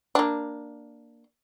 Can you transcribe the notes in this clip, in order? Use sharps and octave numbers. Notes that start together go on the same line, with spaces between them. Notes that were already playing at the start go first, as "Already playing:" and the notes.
A#3 D4